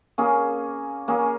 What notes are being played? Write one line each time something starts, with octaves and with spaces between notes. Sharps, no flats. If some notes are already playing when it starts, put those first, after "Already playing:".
A#3 C#4 G#4
A#3 C#4 G#4